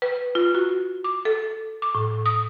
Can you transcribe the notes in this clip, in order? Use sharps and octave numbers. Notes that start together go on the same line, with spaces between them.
B4
F4
F#4
D6
A4
D6
A2
D#6